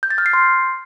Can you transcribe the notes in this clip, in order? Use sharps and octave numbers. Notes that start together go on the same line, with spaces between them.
G6
A6
F6
C7
C6